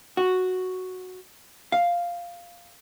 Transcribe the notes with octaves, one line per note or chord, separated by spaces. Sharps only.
F#4
F5